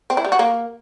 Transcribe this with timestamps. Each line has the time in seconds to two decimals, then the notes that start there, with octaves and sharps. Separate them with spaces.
0.10 C4
0.17 E4
0.25 G3
0.32 F#4
0.39 A#3